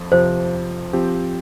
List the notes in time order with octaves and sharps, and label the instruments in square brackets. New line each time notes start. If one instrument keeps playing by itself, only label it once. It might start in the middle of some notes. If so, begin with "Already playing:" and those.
Already playing: [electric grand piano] F2 F3
[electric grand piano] F2 C3 F3 [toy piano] C5
[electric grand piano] F3 C4 G4